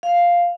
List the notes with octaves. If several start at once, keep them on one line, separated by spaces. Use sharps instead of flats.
F5